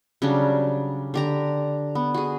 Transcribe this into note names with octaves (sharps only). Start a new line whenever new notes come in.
C#3 F#3 G3 D4
D3 G4 A#5
B3
F#4 G#4